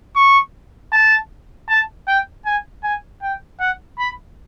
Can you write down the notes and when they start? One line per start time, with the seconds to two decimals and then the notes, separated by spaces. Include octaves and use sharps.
0.16 C#6
0.93 A5
1.69 A5
2.08 G5
2.46 G#5
2.83 G#5
3.22 G5
3.60 F#5
3.99 B5